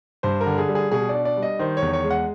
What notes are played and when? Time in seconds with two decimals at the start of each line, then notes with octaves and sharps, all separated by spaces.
0.23 G2 C5
0.41 A#4
0.46 D3
0.58 G#4
0.69 G3
0.75 G#4
0.91 B2 G#4
1.09 D4 D5
1.25 D5
1.37 G3
1.43 D#5
1.59 D#3 C5
1.77 C#5
1.82 E2
1.93 C#5
2.04 G#3
2.11 F#5